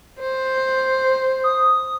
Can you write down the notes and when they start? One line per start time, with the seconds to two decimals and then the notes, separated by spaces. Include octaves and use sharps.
0.20 C5
1.44 D#6